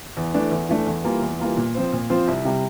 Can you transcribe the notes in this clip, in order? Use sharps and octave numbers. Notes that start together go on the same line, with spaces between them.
E2
E3 A3 D4
E2
E3 A3 D4
E2
E3 G3 A#3 F4
E2
E3 G3 A#3 F4
A#2
F3 C4 F4 C5
A#2
F3 C4 F4 C5
C2
C3 G3